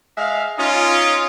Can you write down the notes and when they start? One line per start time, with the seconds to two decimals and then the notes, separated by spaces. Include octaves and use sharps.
0.17 G#3 E5 F5
0.58 C#4 D#4 F4